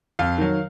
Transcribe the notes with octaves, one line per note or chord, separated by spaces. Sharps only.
F2 F5
D#3 F#3